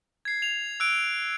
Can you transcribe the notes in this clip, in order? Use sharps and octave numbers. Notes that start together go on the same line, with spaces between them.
G#6 C7
F7
E6 F#6 D7